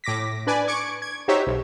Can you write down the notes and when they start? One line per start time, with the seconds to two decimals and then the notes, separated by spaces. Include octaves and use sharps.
0.04 A2 D6 A#6 B6
0.47 D4 B4 D5 G#5
0.67 C#6 D6 G#6 C#7 D7
1.02 G#6
1.28 D#4 F#4 G4 C5 C#5 E5
1.47 B1